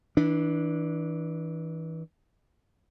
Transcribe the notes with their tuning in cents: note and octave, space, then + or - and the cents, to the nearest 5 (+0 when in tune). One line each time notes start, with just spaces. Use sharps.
E3 -25 D4 +0